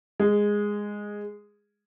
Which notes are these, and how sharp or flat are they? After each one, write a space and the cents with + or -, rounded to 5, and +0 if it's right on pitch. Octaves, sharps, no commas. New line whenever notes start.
G#3 -10